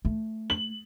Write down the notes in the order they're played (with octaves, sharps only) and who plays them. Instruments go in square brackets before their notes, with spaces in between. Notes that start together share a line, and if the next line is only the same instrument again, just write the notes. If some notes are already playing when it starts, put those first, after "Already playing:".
[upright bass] A3
[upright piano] F#7